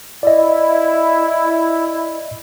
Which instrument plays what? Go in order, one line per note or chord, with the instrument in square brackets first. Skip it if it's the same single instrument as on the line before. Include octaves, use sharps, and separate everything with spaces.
[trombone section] E4 [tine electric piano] D5 D#5